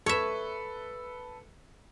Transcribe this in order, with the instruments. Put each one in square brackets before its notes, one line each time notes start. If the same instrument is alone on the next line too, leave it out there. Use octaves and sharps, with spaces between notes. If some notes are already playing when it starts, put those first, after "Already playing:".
[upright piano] A4 B4 [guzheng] C#5 E5